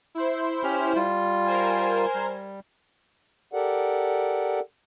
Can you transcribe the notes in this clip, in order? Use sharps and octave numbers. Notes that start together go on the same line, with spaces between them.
E4 C5
C#4 G4 F6
G3 F4
A#4 C5 G#5
G3
G4 A4 A#4 D5 F#5